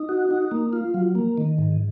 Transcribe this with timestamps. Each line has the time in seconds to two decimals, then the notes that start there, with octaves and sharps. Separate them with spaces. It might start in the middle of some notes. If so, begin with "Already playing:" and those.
Already playing: D#4
0.09 F#4
0.31 D#4
0.51 A#3
0.73 F4
0.94 F#3
1.15 A#3
1.38 D#3
1.58 G#2